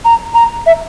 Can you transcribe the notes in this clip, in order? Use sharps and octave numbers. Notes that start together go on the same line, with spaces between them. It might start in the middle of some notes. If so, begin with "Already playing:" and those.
A#5
A#5
E5